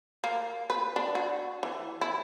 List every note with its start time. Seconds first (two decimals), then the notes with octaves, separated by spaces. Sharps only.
0.24 A#3
0.70 B4
0.96 D4
1.15 F#4
1.63 E3
2.01 E4